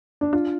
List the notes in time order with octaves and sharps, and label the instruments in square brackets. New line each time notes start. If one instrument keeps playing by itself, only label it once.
[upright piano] D4
[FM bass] D4 [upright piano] F4